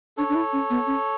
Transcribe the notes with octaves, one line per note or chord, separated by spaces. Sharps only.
D4 A4 C#5
D4
E4
C#4
B3
C#4